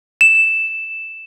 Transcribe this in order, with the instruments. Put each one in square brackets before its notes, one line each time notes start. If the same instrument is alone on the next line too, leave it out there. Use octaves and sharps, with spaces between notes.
[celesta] E7